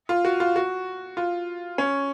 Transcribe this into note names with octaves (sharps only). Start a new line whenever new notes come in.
F4
F#4
F4
F#4
F4
C#4